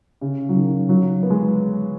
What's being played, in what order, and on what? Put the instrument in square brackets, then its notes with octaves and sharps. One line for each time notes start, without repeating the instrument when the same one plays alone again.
[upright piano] C#3
F#3
D#3
F#3
B3
G#3